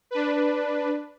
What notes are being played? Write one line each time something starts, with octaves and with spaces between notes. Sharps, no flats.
D4 B4